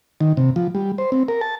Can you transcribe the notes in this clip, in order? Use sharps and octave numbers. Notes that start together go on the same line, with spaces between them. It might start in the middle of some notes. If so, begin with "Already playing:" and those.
D#3
C3
F3
G3
C5
C4
A#4
A5